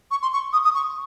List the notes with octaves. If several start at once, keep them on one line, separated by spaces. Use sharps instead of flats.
C#6
C6
C#6
D#6
D#6
C#6